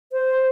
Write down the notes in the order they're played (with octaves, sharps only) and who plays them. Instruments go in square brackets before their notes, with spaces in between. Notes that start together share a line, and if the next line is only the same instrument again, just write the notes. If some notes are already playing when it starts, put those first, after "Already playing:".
[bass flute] C5